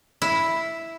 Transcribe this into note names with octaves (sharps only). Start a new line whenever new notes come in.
E4